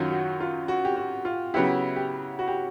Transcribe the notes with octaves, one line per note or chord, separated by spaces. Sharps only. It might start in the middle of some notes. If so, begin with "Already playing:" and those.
Already playing: F#2 D#3 F#3 F4
F#4
F4
F#4
G4
F#4
F4
C#3 F#3 B3 E4 G4
G4
F#4
G4